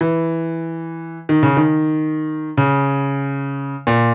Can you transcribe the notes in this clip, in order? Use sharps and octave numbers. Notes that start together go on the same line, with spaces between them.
E3
D#3
C#3
D#3
C#3
A#2